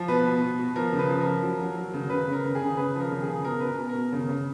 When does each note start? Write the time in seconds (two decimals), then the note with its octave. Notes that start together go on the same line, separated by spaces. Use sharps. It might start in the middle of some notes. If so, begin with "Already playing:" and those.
Already playing: F3
0.08 B2 B4
0.26 B2
0.41 B2
0.59 B2
0.76 F3 A#4
0.93 C#3
0.99 B4
1.09 F3
1.21 A#4
1.26 F3
1.43 F#3
1.60 F#3
1.77 F#3
1.93 C#3
2.10 C#3 B4
2.27 C#3
2.32 A#4
2.44 C#3
2.55 G#4
2.61 C#3
2.77 C#3 B4
2.95 F3
3.00 A#4
3.11 C#3
3.22 G#4
3.28 C#3
3.45 B2 A#4
3.60 B2 B4
3.67 A#4
3.79 B2
3.89 A#4
3.95 B2
4.12 C#3
4.28 C#3